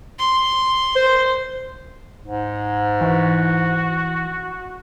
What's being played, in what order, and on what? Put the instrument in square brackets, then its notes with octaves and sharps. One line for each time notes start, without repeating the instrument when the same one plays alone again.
[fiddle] C6
[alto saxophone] C5
[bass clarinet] G#2
[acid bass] E3 [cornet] F#4